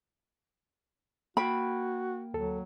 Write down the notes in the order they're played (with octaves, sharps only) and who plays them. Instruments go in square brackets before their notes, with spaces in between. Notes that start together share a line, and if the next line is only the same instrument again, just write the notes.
[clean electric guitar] A#3 G5 [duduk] F#4 [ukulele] B5
[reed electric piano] D2 A4 [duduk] F#3